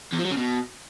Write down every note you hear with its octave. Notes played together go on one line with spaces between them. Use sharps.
E2
F3
F#3
C#3
B2